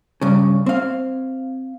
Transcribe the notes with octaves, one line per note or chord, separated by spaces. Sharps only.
G2 C#3
C4 F5